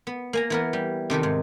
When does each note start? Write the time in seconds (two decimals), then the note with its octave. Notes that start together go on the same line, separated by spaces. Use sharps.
0.07 B3
0.33 A#3 G#5 A#5
0.50 E3 B3 A#4
0.73 G3
1.10 C3 D#3 A4 B4
1.23 G#2